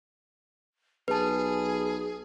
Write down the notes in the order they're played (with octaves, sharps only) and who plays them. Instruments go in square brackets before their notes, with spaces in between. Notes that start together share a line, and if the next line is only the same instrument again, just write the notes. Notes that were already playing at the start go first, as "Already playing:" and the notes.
[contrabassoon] B1 [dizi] G#4 [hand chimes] B4 A5